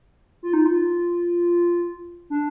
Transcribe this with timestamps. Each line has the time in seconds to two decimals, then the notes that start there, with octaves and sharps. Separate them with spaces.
0.43 F4
0.53 D#4
0.66 F4
2.30 D4